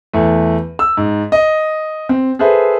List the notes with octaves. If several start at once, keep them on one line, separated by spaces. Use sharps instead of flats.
E2 A3
E6
G#2
D#5
C4
G#4 A4 B4 C5 E5